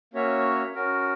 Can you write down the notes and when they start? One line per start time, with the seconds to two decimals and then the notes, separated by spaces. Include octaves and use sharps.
0.14 A#3 C#4 F#4 C#5 E5
0.75 C#4 F#4 A#4